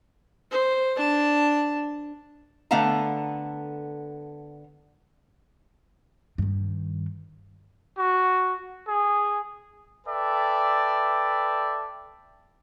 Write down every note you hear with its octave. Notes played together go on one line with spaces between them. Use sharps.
C5
D4 A5
D3 A3 B3 F5 A5 A#5
G2 D#3
F#4
G#4
A4 B4 D5 E5 G5